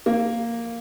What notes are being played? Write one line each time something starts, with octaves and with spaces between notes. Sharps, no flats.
A#3